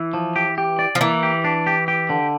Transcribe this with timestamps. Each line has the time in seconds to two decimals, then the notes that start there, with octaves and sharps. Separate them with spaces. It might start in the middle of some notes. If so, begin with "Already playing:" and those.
Already playing: E3
0.14 F3
0.36 G4
0.58 G4
0.79 D5
0.95 F3
1.00 E3 A#3
1.23 G4
1.44 D4
1.67 G4
1.88 G4
2.10 D3